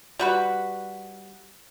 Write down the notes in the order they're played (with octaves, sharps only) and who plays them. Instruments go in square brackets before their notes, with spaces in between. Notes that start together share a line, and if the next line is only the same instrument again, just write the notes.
[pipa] G3 F#4 B4